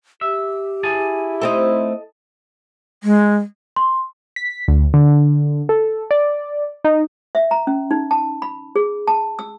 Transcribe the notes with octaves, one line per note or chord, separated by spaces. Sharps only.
G4 E5
E4 G#4 G#5 A5
A3 C4 D#4 A4 D#5
G#3
C6
B6
D2
D3
A4
D5
D#4
E5
A#5
C#4
D#4
A5
B5
G#4
A5
E6